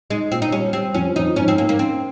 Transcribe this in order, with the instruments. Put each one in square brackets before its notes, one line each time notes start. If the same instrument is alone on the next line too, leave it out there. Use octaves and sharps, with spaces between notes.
[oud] G#3 [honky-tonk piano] D#4
[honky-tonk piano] A#2 [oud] C4
[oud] D#4
[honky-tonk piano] G3 [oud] C#4
[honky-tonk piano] G3 [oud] C4
[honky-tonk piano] F2 [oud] C#4
[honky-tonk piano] F2 [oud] D#4
[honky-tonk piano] G#2 [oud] C#4
[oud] C4
[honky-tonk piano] G#2 [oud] A#3
[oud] A#3
[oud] C4 [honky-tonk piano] C#4